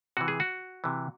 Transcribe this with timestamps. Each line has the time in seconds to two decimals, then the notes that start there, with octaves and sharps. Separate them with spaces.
0.17 C3 E3 F#4
0.28 G#4
0.40 F#4
0.84 C3 E3